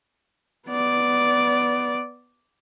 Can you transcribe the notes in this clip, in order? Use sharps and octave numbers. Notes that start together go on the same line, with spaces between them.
B3 D5